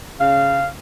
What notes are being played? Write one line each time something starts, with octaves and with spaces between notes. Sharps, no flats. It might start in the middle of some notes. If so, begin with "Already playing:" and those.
C#3 F5